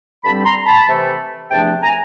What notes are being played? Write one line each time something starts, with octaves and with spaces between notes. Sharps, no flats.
G2 D3 G3 C4 A5 B5
A#5 C6
A5 B5
C3 E3 A3
E2 C3 F3 A3 D4 G5 A5
G#5 A#5